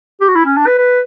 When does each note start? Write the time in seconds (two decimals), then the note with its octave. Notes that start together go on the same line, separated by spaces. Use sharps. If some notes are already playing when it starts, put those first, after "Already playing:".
0.21 G4
0.28 F#4
0.35 E4
0.46 C#4
0.57 D4
0.67 B4
0.78 B4